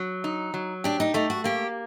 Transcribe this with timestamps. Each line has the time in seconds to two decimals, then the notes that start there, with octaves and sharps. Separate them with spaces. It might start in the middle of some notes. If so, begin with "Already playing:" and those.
Already playing: F#3
0.24 D#4
0.54 F#3
0.84 D4 G4
1.00 D#4
1.14 A3 D#4
1.30 F#4
1.44 A#3 G4